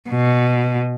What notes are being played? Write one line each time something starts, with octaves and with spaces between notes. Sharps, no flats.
B2